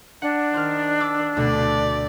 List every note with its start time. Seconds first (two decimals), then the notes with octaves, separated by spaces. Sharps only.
0.22 D4 F#5
0.54 D#3 C5 F6
1.00 D6 E6
1.37 D2 B2 A3 D5